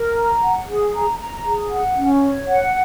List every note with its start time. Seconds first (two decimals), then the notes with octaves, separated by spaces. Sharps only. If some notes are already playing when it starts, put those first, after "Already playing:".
Already playing: A#4
0.16 A#5
0.42 F#5
0.67 G#4
0.93 A#5
1.19 A#5
1.45 G#4
1.71 F#5
1.96 C#4
2.23 C#5
2.48 F#5